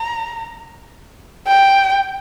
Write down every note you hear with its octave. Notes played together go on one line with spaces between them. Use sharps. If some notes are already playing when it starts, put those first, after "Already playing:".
Already playing: A#5
G5